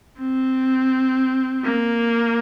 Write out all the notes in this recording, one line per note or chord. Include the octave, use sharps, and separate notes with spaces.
C4
A#3